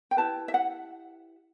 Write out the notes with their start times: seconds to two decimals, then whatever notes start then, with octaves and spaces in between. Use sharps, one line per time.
0.11 G5
0.17 E4 G4 B4 A5
0.48 E5
0.54 F#5